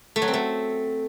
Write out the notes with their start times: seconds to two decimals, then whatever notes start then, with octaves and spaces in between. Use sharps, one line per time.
0.16 A3
0.22 F#3
0.28 C4
0.34 A3